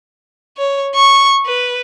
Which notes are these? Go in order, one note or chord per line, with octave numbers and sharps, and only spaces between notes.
C#5
C#6
B4